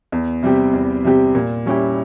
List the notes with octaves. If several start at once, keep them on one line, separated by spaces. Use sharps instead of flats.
E2
C3 G3 C4 G4
E2
C3 G3 C4 G4
A#2
G3 C#4 E4 G4